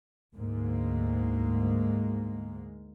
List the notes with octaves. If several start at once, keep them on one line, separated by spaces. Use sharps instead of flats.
D2 G#2 G#3 A#3